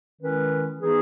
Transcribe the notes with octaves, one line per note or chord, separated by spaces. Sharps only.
D#3 G#3 C#4 E4 B4
E3 B3 D#4 G#4